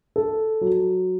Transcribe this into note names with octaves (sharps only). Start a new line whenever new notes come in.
A4
F#3